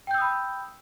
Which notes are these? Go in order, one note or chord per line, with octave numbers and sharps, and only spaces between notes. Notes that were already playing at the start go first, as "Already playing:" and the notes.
G5 B5 D#6 E6 G6